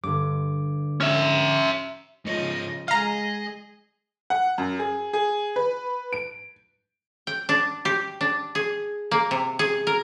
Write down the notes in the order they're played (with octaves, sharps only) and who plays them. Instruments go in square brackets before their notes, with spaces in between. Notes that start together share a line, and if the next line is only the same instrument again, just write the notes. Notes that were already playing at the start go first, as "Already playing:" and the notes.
[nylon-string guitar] G2 [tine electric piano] D3 D6
[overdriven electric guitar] C#4 E5
[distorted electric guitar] G#2 C#5 [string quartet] C#3 F3 D#5
[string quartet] G#3 G#4 [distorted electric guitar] D#5 [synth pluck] F5 A#5
[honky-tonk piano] F#5
F#2
G#4
G#4
B4
D7
[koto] G5
D4
G4
D4
G#4
A#3
C3
G#4
A#4